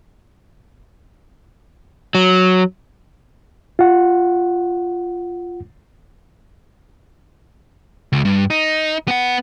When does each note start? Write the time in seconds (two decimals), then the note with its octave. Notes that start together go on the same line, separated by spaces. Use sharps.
2.15 F#3
3.79 F4 F#5
8.12 C#2
8.25 G2
8.50 D#4
9.08 B3 F#5